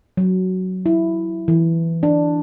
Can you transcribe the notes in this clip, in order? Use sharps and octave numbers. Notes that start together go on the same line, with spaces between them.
F#3
E4
E3
D4